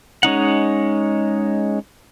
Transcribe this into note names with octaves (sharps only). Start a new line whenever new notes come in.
G#3 C#4 D#4 F#5